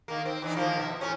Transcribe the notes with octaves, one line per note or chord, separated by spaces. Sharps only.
D#3 A#3
C4
E3 D4 D#4
D#3 F3 A#3
B2 E5
A2 A3 C#4